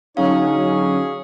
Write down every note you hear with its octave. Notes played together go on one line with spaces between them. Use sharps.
D3 F#3 C#4 D#4 G#4 C#5 F5